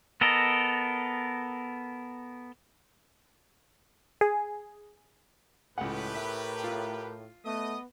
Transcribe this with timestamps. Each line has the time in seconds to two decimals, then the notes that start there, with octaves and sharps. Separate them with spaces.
0.21 B3 A4 A#4 D#5
4.21 G#4
5.78 C#2 A2 G4 B4 F#5
6.15 A#4 E5
6.64 F4
7.45 A3 B3 D#5 D#6